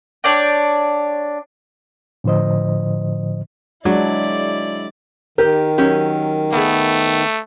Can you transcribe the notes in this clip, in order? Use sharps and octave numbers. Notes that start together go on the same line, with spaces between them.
D4 C#5 D5 G5
A2 D3 F3 C5 D#5
F#3 G#3 D4 E4 D5
D#3 G4 A#4
F#3 C#4 G4
A3 B3 G#4